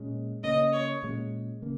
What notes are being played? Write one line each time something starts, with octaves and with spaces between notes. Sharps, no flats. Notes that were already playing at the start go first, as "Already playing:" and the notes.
Already playing: A#2 G#3 C#4
C#3 A#3 C#4 D#5
C#5
A#2 G#3 C#4
C#3 A#3